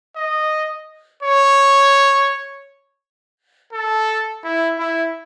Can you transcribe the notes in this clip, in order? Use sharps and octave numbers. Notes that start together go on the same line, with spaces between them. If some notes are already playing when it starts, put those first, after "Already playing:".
D#5
C#5
A4
E4
E4